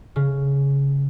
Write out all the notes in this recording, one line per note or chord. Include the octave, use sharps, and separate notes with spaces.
C#3